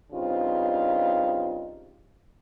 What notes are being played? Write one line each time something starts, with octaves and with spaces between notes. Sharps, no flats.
G2 C#3 C4 D#4 F4